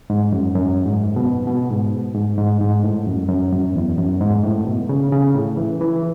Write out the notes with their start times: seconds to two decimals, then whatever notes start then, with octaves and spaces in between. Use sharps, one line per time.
0.10 G#2
0.32 F#2
0.56 F#2
0.86 G#2
1.16 B2
1.47 B2
1.70 G#2
2.15 G#2
2.38 G#2
2.61 G#2
2.84 A2
3.07 F#2
3.29 F#2
3.52 F#2
3.76 E2
3.98 F#2
4.21 G#2
4.43 A2
4.67 B2
4.89 C#3
5.12 C#3
5.35 A2
5.57 E3
5.81 E3